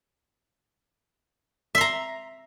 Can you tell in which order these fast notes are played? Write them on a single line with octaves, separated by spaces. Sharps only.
E5 C6 A#5